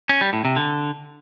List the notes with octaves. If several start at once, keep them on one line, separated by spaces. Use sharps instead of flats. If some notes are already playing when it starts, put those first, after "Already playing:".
C#4
G3
A2
C3
D3